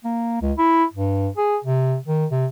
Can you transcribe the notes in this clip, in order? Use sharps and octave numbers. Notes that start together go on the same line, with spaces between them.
A#3
C#2
E4
G2
G#4
C3
D#3
C3